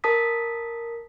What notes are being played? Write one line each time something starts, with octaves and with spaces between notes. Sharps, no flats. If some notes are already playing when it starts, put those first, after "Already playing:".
A#4 A5 D#6 B6